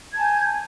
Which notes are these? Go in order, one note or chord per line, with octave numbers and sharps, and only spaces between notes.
G#5 A5 G6 G#6